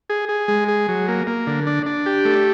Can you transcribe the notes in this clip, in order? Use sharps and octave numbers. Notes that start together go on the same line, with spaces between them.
G#4
G#4
G#3
G#4
F#3
A#3
A#3
D3
D4
D4
G4
A3